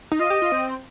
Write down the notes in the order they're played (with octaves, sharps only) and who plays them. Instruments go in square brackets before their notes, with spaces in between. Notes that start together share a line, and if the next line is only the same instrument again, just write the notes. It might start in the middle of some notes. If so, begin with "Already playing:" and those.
[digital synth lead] D#4
[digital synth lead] F4 [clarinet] D#5
[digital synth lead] G4
F4
C4